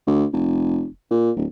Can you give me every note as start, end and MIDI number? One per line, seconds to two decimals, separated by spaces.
0.07 0.25 38
0.33 0.86 29
1.11 1.31 46
1.37 1.45 26